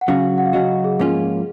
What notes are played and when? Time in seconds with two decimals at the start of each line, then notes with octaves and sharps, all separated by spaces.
0.01 F#5
0.08 C#3 F#3 C#4 F#4 F5
0.38 F#5
0.46 F5
0.53 C#3 F#3 C#4 F#4 D#5
0.84 G#4
0.99 G#2 F3 A#3 C#4 F4 G#4